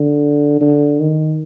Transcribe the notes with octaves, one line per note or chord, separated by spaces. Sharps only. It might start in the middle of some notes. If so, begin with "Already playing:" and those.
Already playing: D3
D3
D#3